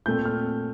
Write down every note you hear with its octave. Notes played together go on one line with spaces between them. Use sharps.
A#2 A3 C4 G6
F6